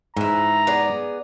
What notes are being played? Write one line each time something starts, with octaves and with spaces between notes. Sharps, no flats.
G#2 E3 E4 A#5
B3 G#4 D5